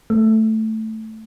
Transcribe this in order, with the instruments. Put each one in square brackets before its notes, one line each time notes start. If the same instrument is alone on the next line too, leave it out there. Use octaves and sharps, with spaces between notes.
[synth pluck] A3